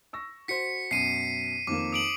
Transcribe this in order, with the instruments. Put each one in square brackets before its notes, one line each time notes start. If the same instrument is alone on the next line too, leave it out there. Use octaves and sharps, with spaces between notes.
[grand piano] C#6 E6 A#6
[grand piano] F#4 C5 [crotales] B6 C#7
[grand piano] F#2 B2 [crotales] C7 D#7
[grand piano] F2 D#3 A#3 [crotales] D6
[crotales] D#6 D7 F#7